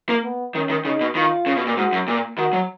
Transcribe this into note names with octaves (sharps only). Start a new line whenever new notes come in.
A#3
B3
D#3 C#4
D#3
C#3 D#4
B2
D#3 F4
C#3
B2
A#2
G#2 F#4
F#2
A#2
D#3 F#4
F#3